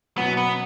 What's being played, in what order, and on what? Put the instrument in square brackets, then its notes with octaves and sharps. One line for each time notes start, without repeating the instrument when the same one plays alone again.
[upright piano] B2 F#3 C#4 [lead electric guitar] B3
[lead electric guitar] B3